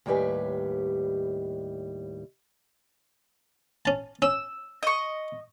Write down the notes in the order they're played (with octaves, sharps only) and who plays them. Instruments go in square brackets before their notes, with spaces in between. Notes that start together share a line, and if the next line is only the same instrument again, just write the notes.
[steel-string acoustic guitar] D#2 A2 G3 G4 B4 G#5
[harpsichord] C#4 A5
[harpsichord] C#4 [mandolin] E6
[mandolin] D#5 C#6